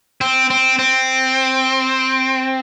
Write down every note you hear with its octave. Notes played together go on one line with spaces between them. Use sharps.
C4
C4
C4